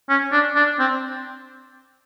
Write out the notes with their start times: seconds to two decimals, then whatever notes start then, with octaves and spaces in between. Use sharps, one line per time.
0.09 C#4
0.32 D4
0.56 D4
0.79 C4